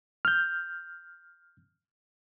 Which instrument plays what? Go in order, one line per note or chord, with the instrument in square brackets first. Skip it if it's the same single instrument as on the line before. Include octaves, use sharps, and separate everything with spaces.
[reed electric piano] F6 G6